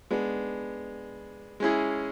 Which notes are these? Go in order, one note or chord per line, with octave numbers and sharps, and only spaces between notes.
G#3 B3 D4
G#3 C#4 E4 G#4